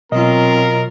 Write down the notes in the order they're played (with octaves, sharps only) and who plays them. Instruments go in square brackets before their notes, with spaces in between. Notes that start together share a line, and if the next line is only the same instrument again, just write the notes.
[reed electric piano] B2 D#5 [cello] F#3 F4 [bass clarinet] C4 [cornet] A#4